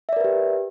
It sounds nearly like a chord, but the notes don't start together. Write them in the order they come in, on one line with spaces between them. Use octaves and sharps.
E5 D5 A#4 B4 G4